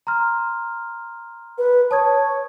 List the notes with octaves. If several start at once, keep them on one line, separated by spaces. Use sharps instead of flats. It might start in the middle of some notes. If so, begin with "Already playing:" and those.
A#5 C6 F6
B4
C#5 A5 D#6 G#6